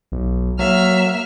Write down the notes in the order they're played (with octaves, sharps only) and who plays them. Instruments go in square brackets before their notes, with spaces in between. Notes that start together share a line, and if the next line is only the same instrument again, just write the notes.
[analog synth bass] B1
[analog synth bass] F#3 [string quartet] A#3 E5 F6